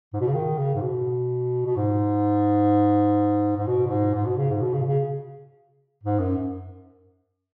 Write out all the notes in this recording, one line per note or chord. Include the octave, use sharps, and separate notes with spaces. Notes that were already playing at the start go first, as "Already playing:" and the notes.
G#2
B2
C#3
D#3
C#3
G#2
B2
B2
G#2
G#2
B2
B2
G#2
G#2
B2
C#3
G#2
B2
C#3
B2
C#3
G#2
F#2